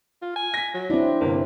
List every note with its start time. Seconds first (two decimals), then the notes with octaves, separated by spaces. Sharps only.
0.22 F4
0.36 G#5
0.54 A#6 B6
0.74 F#3
0.90 C4 D4 E4
1.21 G1 C3 A#3